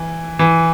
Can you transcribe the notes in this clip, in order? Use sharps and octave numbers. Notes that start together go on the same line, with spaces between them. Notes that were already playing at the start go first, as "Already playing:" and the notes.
Already playing: E3
E3